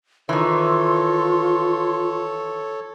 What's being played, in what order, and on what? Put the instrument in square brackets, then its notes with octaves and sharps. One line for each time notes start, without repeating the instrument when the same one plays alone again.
[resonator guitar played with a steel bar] D#3 E3 [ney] F4 [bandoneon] A4 C#5 [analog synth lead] C6